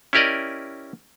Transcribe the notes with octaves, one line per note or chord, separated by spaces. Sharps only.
C#4 E4 G4 A#4 D5 D#5